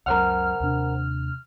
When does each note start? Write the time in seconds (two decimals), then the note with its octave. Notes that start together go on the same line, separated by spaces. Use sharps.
0.06 C#2 F#2 A#4 C5 F#5 F6
0.60 D#2 C3 D4